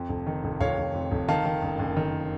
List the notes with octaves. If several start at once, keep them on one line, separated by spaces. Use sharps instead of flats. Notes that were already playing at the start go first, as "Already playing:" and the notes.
Already playing: F2
F1
D#3
F1
F1 C#5 F5
F1
F2
F1
D#3 F5 A5
D#3
F#1
F#1
D#3